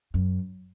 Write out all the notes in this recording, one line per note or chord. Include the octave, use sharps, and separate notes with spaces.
F#2